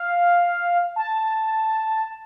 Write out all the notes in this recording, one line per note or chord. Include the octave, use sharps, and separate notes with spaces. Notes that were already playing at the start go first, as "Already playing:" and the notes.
Already playing: F5
A5